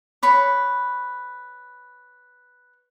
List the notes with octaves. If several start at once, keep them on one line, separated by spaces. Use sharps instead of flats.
B4 C#5 B5